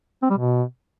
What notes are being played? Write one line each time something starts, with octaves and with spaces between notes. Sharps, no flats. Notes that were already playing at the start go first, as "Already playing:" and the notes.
C4
G3
B2